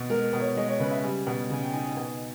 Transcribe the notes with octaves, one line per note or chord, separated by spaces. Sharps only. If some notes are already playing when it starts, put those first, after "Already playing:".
Already playing: B2
G#3 A#4
B2
C#5
G#3 D#5
C#5
C#3 B4
E5
G3 G#5
B2
C#3 G#5
G5
D#4 G#5
G#5
B2 G#5